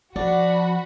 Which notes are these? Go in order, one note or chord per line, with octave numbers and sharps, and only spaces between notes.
F3 D4 F#4 F#5 B5